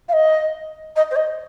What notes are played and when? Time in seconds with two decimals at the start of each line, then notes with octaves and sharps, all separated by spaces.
0.09 F5
0.13 D#5
0.96 D#5
1.11 C5
1.16 D#5